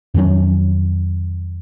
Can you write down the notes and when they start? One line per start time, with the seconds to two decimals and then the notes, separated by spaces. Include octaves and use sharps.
0.14 F2 D#3 F#3 C#4